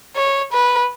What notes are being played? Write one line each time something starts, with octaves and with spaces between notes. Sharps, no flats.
C#5
B4